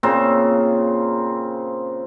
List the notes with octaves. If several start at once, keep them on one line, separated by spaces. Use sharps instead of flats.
A#2 C#3 C4